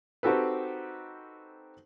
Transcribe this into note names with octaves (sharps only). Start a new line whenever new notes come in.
C4 D#4 F#4 G4 A4 B4